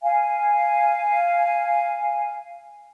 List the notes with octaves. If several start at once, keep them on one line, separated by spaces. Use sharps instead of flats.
F5 G#5